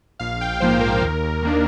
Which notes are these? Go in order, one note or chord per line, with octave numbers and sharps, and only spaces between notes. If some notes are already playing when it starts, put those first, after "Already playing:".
A#1 F5
G5
G#2 F3 A#3 C5
A#4
D#2
D#3 A#3 D4